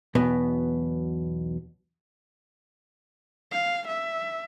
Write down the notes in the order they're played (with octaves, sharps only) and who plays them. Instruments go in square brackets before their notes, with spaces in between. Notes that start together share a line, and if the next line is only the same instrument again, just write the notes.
[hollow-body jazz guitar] B1 E2 B2 B3
[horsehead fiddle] F5
E5